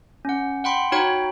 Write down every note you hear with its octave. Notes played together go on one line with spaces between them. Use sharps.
C#4 F#5
F#5 G5 B5 C6
D#4 F#4 C#5 G5 B5